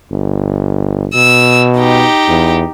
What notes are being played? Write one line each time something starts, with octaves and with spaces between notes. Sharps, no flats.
G1
B2 E6
D#4 G4
E2